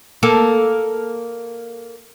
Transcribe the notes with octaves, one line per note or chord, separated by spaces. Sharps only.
A#3 A4